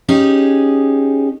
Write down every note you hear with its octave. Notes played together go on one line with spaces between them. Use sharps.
C#4 D#4 G4 G#4